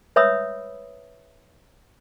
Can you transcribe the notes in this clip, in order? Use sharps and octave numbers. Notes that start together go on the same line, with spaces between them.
B4 C#5 E5 B5 D#6 E6